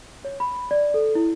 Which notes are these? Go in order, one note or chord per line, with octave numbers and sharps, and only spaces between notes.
C#5
B5
D5
A4
E4